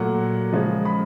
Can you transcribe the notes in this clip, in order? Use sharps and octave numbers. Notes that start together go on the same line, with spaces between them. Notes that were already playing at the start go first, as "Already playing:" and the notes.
Already playing: A#2 F#3 A3 F#5
C#3 F3 G#3
B5